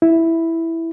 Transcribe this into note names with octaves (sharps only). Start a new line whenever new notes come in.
E4